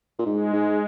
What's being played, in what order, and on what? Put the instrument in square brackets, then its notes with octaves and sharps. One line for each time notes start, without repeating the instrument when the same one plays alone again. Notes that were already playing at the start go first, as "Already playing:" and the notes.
[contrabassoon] A#2
[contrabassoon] G#2 [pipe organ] G#3
[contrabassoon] G#2